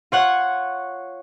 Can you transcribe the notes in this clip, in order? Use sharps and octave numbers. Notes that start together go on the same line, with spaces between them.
F4 C#5 F#5